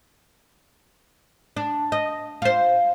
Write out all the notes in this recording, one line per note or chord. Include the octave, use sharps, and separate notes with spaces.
D4
D#5
F4 C5